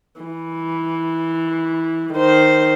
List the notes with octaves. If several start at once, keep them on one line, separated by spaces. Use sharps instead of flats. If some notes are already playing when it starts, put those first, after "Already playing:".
E3
D#3 C5